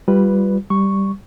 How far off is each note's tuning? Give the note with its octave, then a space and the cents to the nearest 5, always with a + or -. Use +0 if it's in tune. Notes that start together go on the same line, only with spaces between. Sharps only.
G3 +0 F4 +0 B4 +0
G3 +0 C#6 +0